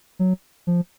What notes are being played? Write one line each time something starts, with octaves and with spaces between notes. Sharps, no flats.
F#3
F3